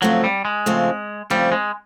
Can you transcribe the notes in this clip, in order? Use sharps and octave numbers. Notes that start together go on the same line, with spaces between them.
C#3 F3 F#3 A3 C4
G3
G#3
C#3 F3 A3 C4
C#3 F3 G3 A3 C4
G#3